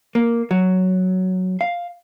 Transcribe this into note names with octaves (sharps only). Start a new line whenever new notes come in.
A#3
F#3
F5